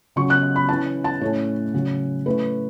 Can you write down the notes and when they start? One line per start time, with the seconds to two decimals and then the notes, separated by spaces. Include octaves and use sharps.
0.16 C#3 F#3 C#4 C#6
0.30 F#6
0.56 B5
0.69 E3 C#4 A5
1.04 A5
1.21 A2 A3 C#4 C#5
1.74 C#3 F#3 C#4
2.26 A2 A3 C#4 B4